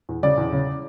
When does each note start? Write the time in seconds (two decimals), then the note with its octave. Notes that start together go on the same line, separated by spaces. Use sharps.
0.09 E2
0.23 C#3 D5
0.38 E2
0.53 C#3